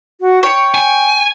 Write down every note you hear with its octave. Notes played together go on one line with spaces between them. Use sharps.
F#4
C#5 G5
G#5